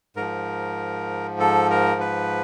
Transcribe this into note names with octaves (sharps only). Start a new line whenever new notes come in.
G#2 F3 A#4
A4
A#4
B4